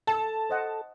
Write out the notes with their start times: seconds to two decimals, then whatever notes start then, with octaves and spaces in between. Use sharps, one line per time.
0.07 A4 A5
0.50 C5 D#5 F#5